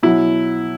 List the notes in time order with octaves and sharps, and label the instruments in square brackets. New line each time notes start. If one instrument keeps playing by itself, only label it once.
[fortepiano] B2 F#3 E4